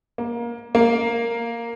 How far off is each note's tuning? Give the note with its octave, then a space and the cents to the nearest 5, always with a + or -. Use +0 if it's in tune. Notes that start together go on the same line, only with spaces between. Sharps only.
A#3 +20
A#3 +0